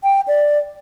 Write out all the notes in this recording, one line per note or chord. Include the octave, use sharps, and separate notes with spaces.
G5
D5